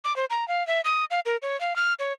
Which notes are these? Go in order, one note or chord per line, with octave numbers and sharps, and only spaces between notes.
D6
C5
A#5
F5
E5
D#6
F5
A#4
C#5
F5
F6
C#5